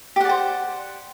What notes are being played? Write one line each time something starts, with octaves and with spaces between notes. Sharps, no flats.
G4 C5 D5 F#5